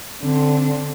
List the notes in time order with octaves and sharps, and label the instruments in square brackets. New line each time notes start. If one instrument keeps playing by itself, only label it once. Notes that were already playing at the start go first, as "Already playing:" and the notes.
[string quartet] D3 [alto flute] C4